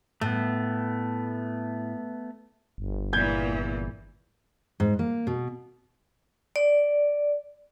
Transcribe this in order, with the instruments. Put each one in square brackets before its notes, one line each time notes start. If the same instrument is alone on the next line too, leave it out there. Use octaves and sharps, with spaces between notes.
[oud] A2 [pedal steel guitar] A3 B3
[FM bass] G1
[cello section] E2 A#2 E3 [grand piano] G6 G#6
[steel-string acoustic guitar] G#2
A#3
B2
[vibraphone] D5